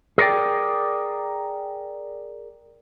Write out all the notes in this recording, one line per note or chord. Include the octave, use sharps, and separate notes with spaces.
G#4 A#4 C#5 D5 G5